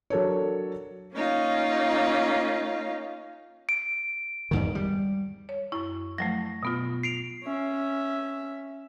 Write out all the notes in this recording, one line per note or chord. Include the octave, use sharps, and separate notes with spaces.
F#3 D4 A4 A#4 C#5
A#3 C#4 D#4 F4
D7
E2 G#2 D#3
G3
C#5
F#2 E4 C#6
F3 F#3 A3 A#6
B2 B3 F4
C7 D7 F7
C#4 E5